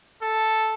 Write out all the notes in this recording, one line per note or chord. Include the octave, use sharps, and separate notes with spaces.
A4